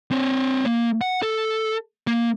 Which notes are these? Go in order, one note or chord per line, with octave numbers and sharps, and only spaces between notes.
C4 C#5
A#3
F#5
A4
A#3